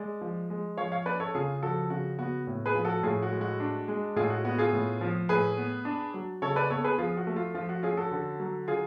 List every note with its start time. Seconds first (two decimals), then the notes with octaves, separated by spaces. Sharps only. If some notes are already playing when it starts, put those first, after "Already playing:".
Already playing: G#3 D5
0.21 F3
0.50 G#3
0.77 F3 C#5 F5
0.92 C#5 F5
1.06 C#4 B4 D5
1.20 A4 C#5
1.34 C#3 F4 G#4
1.63 F3 F#4 A4
1.90 C#3 F#4
2.19 B3 F#4
2.47 A2
2.66 G#4 B4
2.75 F3
2.85 F#4 A4
3.03 A2 F4 G#4
3.22 F#4
3.32 G#3
3.41 F#4
3.60 D4
3.88 G#3
4.16 A2 F4 G#4
4.30 F#4
4.45 B3 F#4
4.58 F4 G#4
4.73 A2
5.01 F3
5.29 A2 G#4 B4
5.57 B3
5.85 D4
6.14 F#3
6.42 C#3 A4 C#5
6.56 B4 D5
6.70 B3 A4 C#5
6.84 G#4 B4
6.98 F3 F4 G#4
7.17 F#4
7.27 A3
7.36 F4
7.55 F3 F4
7.69 F#4
7.83 C#4 F4 G#4
7.97 F#4 A4
8.11 D3
8.40 F#3
8.68 D3 F4 G#4